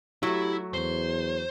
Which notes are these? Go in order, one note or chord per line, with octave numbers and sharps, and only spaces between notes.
F#3 A3 E4 G4
E2 C5